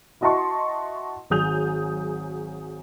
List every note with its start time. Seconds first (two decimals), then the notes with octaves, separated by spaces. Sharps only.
0.21 E4 F#4 D#5 A5 C6 C#6
1.30 G#1 F#3 G#4 D#6 G6 F7